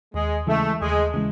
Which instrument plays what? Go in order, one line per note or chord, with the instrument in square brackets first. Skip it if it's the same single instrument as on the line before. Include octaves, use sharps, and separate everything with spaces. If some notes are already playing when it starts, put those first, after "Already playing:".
[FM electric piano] D#2 [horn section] G#3
[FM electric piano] C#3 E3 G#3 [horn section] A3
[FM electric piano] D#2 [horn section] G#3
[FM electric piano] C#3 E3 G#3